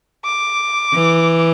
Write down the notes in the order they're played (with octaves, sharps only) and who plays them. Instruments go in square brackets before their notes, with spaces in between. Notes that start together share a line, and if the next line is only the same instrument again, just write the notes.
[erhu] D6
[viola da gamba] E3